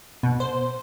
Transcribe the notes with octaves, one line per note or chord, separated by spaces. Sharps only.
B2
C5